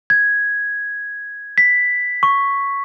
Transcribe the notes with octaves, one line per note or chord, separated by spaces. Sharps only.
G#6
B6
C#6